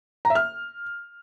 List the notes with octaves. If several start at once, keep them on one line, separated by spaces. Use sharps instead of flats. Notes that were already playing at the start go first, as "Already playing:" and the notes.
A#5
E5
F6